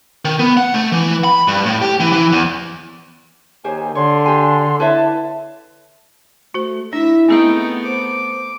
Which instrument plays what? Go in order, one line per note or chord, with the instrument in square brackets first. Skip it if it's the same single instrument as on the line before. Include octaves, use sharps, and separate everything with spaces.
[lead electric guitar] D#3
B3
F#5
A3
E3
B5
G2
A2
G4
E3
E3
E2
[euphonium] D#2 [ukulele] G4 C5 C#5 [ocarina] G#5
[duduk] D3 [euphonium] D4 [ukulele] C#5 [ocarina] C6
[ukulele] G4 G#5
[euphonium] E4 [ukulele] B4 C#5 E5 [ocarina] A5
[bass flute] A3 [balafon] F#4 C5
[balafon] D4 [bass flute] E4 [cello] E5
[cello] A3 B3 [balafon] C4 G#4 E5 [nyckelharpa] D#4 G5
[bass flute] C5 [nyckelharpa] D6